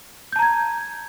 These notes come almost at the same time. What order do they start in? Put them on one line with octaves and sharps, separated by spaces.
G6 A5 A#5 G#6